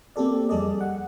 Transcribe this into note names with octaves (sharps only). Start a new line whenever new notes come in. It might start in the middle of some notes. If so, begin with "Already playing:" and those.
A#3 C4 G4 A4 D5
F2 G3 G#4 A4 D5 D#5
F#5